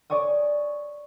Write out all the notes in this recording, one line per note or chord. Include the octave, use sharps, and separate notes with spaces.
C#5 D5 G#5 C#6 D#6